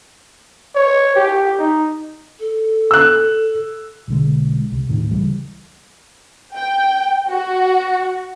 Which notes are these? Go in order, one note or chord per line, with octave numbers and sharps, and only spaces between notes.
C#5
G4
D#4
A4
E6 F#6
B1 D3 G#3
C2
D#2 A2 D#3
C#2 E3 G3
G5
F#4